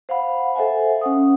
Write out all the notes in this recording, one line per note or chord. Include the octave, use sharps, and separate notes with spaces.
C5 F5 F#5 B5
A4 C5 E5 F#5 G#5
C#4 F#5 D#6